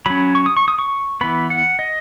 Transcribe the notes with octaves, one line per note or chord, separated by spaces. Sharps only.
F#3 C#4 B5
C#6
D#6
C#6
D#6
C#6
E3 B3 B5
F#5
D#5